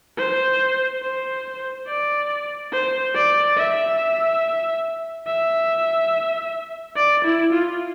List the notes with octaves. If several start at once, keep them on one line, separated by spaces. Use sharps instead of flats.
C5
C5
D5
C5
D5
E5
E5
D5
E4
F4